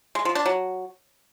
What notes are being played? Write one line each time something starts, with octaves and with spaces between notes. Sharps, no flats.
G#3
F3
D4
F#3